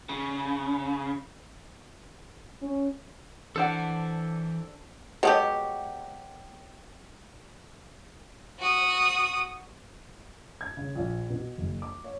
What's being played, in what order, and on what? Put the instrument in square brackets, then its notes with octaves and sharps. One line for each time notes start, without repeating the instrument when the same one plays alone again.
[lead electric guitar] C#3
[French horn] C#4
[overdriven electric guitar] E3 [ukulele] D4 F#5 [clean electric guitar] A4 C5 D5
[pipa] B2 F#3 G4 [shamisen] G#3 A4 C#5
[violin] F#4 D#6
[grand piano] G#6
C#3
A#1
B2
F#1
D6
C#5